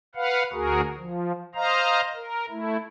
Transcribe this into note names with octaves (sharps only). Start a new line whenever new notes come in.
B4 F5 F#5
D2 F#4 G#4 A#4
F3
C5 D#5 F5 A#5
A#4
A3 E4